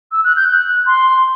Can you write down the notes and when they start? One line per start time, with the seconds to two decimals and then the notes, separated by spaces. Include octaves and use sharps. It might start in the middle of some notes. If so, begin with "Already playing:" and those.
0.11 E6
0.24 F#6
0.36 G6
0.49 F#6
0.86 C6